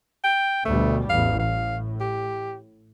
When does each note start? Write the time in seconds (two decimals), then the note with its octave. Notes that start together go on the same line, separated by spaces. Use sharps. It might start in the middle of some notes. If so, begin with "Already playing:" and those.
0.24 G5
0.65 D2 B2 G3 A3
1.10 A1 E2 F5
1.39 A2 F5
2.01 G4